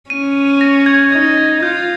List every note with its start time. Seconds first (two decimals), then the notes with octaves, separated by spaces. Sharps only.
0.10 C#4 D#7
0.61 A#6
0.86 G#6
1.12 D#4 G#6
1.38 A#6
1.63 F4 G6